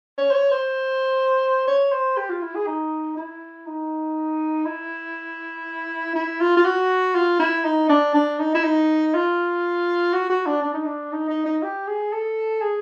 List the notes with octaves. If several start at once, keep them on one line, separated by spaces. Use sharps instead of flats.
C#5
C5
C#5
C5
C#5
C5
G4
F4
E4
G#4
D#4
E4
D#4
E4
E4
F4
F4
F#4
F4
E4
D#4
D4
D4
D#4
E4
D#4
F4
F#4
F#4
D4
D4
D#4
D4
D#4
D#4
D#4
G4
G#4
A4
G#4